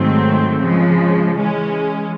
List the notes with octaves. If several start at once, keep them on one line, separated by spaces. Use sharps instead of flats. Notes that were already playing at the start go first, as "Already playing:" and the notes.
Already playing: G#2 D#3 F#3 A3 C4
C#3 F3 G#3
E3 G#3 C#4